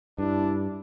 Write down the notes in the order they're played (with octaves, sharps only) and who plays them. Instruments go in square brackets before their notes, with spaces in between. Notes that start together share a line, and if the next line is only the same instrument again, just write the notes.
[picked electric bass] G2 [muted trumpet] D4 [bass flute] E4